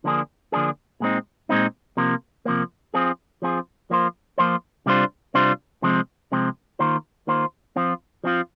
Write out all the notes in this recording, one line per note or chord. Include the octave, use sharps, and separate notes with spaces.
D3 F3 A#3 D4 G#4
D3 F3 A#3 D4 G#4
A#2 G#3 C4 D#4
A#2 G#3 C4 D#4
C3 F3 A#3
C3 F3 A#3
F3 C4 F4 G#4
F3 C4 F4 G#4
F3 A#3 F4 C5
F3 A#3 F4 C5
C3 G3 D4 F4 C5
C3 G3 D4 F4 C5
C3 F3 G#3 C4
C3 F3 G#3 C4
D#3 A#3 F4 C5
D#3 A#3 F4 C5
F3 C4 F4
F3 C4 F4